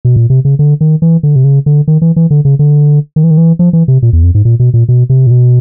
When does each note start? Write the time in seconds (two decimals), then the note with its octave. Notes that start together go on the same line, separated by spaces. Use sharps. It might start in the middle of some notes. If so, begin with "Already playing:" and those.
0.05 B2
0.16 A#2
0.30 C3
0.45 C#3
0.59 D3
0.81 D#3
1.02 E3
1.23 D3
1.36 C3
1.44 C#3
1.66 D3
1.88 D#3
2.02 E3
2.16 E3
2.31 D3
2.45 C#3
2.59 D3
3.16 D#3
3.24 E3
3.31 D#3
3.37 E3
3.59 F3
3.73 E3
3.88 C3
4.03 A#2
4.13 E2
4.23 F2
4.35 G#2
4.45 A#2
4.60 B2
4.74 A#2
4.89 B2
5.10 C3
5.27 A#2
5.31 B2